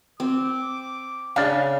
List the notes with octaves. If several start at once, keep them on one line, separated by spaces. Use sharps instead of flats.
C4 D6
C#3 D4 F5